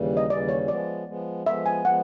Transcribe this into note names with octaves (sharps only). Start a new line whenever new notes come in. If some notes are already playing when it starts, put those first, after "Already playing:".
Already playing: D#2 C#3 E3 G3
D#5
D#2 C#3 E3 G3 D5
C#5
F3 G#3 B3 D5
F3 G#3 B3
F3 G#3 B3 E5
G#5
F3 G#3 B3 F#5